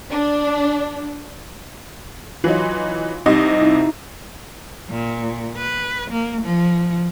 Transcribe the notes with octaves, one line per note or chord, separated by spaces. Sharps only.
D4
E3 F#3 D#4 F4
C2 C3 D#4 D#5
D#4 E4
A#2
B4
A#3
F3